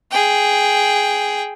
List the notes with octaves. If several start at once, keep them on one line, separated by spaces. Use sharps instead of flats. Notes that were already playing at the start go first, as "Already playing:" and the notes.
G#4 G5